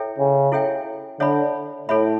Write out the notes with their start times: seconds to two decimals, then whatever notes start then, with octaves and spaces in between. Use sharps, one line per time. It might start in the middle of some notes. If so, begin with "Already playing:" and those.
Already playing: E4 A4 C#5 E5 G5
0.18 C#3
0.52 E4 A4 C#5 E5 G5
1.20 D3 A4 C#5 E5 B5
1.89 A2 A4 C#5 E5 B5